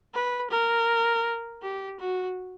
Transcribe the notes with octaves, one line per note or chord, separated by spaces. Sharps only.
B4
A#4
G4
F#4